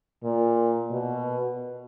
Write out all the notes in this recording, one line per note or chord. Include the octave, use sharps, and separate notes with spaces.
A#2
B2